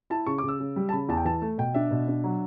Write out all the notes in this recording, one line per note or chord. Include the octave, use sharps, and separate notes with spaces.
E4 A5
C#3 C#6
C#3 D6
E6
C#3
G3
A5
C#3 B5
E2 A5
G5
E3 A5
A3
B2 G5
D4 E5
B2
D4
F#3